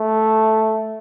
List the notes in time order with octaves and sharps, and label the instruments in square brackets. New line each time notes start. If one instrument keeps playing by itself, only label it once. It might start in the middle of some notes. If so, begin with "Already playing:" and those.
Already playing: [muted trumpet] A3